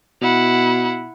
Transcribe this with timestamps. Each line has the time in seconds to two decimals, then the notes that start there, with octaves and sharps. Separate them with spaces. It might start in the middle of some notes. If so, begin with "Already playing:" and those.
0.22 B2 E4 F#5